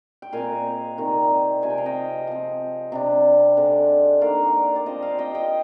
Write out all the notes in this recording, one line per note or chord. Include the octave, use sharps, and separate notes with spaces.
G5
A#2 G#3 C4 F5 G#5
C3 D#3 G3
C3 F3 G#3 G#5
G5
F5
D#5 G5
F3 C4
C3 G3 D4
D3 G#3 C4
D#3 A#3 D4 D5 F5
D5
F3 C4 C5 D#5
D5 F5
D#5 G5
D#5 G5